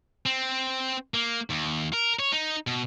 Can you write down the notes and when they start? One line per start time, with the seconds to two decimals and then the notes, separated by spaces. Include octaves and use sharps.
0.26 C4
1.14 A#3
1.50 D#2
1.93 A#4
2.19 C#5
2.32 D#4
2.67 B2